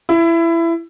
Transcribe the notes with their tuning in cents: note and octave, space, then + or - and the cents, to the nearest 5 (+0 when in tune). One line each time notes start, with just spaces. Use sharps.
E4 +20